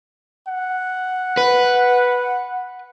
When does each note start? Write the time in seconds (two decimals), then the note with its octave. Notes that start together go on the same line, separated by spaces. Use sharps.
0.48 F#5
1.37 B4